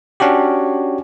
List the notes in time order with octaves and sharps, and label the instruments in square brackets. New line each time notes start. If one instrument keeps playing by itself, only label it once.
[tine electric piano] C#4 D4 F#4 G4